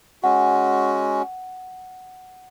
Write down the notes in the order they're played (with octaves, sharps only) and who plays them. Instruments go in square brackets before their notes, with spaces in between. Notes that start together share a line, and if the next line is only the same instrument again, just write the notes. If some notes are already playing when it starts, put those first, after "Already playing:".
[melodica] G#3 C#4 F#4 [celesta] F#5